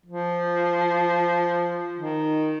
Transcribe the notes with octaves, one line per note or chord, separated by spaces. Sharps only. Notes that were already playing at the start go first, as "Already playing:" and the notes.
F3
D#3